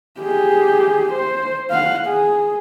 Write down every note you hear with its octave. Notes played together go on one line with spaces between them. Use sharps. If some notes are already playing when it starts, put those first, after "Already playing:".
G4 G#4
C5
F5 F#5
G#4